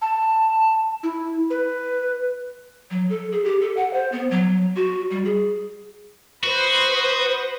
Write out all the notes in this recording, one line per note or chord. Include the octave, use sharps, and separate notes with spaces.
A5
E4
B4
F#3
A4
G#4
G4
A4
F#5
C5
B3
F#3
F#4
G3
G#4
F#4 B4 C5 D#6